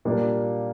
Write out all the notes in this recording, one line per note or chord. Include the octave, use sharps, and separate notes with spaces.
A#2 G3 A#3 D4